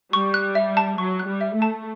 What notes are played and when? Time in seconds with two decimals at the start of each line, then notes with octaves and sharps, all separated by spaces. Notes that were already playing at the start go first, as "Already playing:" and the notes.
0.12 G3 C#6
0.34 F#6
0.55 E5
0.77 A5
0.98 F#3 C#6
1.19 F#6
1.26 G3
1.41 E5
1.55 A3
1.62 A5